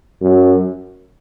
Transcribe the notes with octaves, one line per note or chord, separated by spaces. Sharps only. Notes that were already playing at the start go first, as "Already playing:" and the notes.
F#2